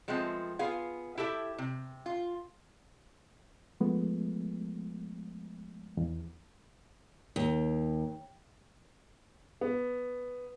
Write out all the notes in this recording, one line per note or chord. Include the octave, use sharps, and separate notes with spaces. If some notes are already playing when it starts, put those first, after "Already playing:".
F3 G#3 A3 B3 C4
B3 F4 G#4 F5
E4 G4 A4 E5
C3
F4
F3 G#3 A3 B3
E2
D#2
B3